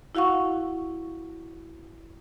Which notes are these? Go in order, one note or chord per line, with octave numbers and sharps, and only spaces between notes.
E4 F#4 F5 F#5 C#6